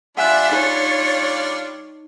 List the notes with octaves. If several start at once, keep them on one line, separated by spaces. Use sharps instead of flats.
G3 D4 F4 E5 F#5 G#5 F#6
D#4 C#5